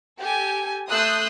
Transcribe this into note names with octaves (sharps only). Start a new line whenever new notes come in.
G4 A4 G#5
A3 C6 D#6 E6 F#6 G6